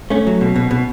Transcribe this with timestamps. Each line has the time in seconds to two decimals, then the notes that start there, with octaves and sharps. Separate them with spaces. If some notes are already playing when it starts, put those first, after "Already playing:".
0.10 A3 C#4
0.27 F#3
0.41 B2
0.56 B2
0.71 B2